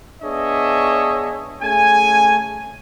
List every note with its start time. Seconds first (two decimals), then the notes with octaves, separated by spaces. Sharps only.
0.23 B3 D4 G#4 C#5 D#5 E5
1.61 A3 C#4 G#4 G#5